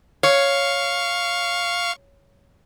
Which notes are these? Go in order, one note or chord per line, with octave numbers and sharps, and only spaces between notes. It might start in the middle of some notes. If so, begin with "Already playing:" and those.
C#5 F5 C#6